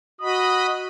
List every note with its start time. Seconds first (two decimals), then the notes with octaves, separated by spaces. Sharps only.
0.21 F#4 D#5 B5 D#6